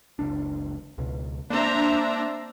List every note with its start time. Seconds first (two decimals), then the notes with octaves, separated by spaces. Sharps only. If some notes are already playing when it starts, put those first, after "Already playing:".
0.19 F#1 C#2 D4
0.98 C#2 B2
1.50 A#3 C4 D4 C5 E5 A#5